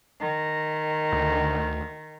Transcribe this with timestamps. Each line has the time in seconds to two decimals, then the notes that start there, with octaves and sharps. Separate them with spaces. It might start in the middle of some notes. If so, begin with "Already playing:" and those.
0.20 D#3
1.13 D2